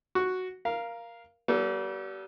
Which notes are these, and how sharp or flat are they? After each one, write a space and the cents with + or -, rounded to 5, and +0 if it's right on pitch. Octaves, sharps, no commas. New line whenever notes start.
F#4 +0 C#6 +0
A#4 +10 F5 -10
G3 -35 B3 -45 A4 +0